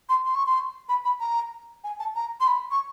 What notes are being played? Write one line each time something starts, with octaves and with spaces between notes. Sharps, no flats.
C6
C6
C#6
C6
B5
B5
A#5
G#5
A5
A#5
C6
B5
C#6